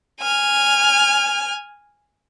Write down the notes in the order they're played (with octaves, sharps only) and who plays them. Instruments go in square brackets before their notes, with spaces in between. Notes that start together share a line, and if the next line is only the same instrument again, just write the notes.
[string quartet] G#5 F6